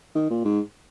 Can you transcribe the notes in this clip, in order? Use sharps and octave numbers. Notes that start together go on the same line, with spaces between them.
D#3
A#2
G#2